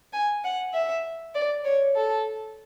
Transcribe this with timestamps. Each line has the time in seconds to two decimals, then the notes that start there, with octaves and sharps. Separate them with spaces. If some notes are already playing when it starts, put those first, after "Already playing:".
0.13 G#5
0.44 F#5
0.73 E5
1.35 D5
1.65 C#5
1.96 A4